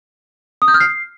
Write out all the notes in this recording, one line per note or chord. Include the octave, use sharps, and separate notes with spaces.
D#6
G6
F6
C7